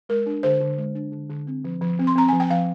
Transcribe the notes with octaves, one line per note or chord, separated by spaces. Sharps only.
G#3 A#4
D4
D3 C5
D3
G#3
D4
D3
D3
C4
F3
F3
C4
C6
C4 A#5
F3 G#5
G5
F3 F5